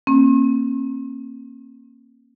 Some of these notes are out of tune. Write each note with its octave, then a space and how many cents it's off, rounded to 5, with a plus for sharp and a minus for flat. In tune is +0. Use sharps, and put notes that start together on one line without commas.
A#3 +0 C#4 -40